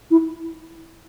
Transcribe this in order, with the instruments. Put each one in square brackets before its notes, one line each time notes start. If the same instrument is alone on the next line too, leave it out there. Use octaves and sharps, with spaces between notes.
[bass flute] E4